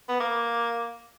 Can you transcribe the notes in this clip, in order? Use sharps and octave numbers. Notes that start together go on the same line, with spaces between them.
B3
A#3